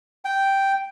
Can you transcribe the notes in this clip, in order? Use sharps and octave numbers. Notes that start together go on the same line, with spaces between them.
G5